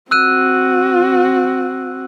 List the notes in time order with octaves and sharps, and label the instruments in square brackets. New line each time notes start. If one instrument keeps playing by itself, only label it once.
[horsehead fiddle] C4 F#4 [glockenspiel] E6 F#6 D#7